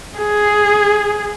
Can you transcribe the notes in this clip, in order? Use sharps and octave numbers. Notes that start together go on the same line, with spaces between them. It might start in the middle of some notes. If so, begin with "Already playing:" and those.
G#4